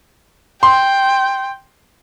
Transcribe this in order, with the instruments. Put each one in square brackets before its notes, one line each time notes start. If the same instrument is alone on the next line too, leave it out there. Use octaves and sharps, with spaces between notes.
[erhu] G5 [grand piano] C6